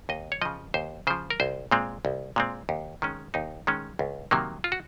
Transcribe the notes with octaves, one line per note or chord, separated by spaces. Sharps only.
D#2 D#5
C#5
C#3 F3 D#5
D#2 C5
C#3 F3 C5
A#4
C2 C5
A#2 G#3 C4
C2
A#2 G#3 C4
D#2
D#3 G#3 C#4
D#2 D#4
D#3 G#3 C#4
C#2
C3 D#3 F#3 A#3
F4
F#4